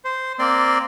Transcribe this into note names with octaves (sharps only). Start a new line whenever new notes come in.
C5
A#3 C4 D5 C6